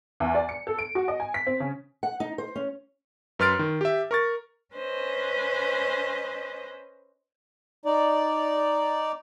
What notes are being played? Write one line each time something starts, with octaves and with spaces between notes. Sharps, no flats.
E2
D5
C#7
A4
D7
F#4
D#5
G#5
B6
C4
C#3
F#5
D#4
C5
C#4
F#2 B4 C6 F6 A6 D7
D#3
G4 E5
A#4 C#6 A6
C#4 B4 C5 D#5
D#4 D5